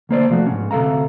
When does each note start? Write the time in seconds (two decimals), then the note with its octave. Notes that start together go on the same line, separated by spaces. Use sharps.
0.09 D2 A#3 C5 D5
0.30 C2 F3 A3 F#4
0.46 G#2 C#4
0.71 D2 C3 F3 A4 F5 A#5